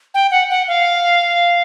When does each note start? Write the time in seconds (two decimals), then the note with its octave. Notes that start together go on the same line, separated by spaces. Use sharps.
0.14 G5
0.31 F#5
0.50 F#5
0.68 F5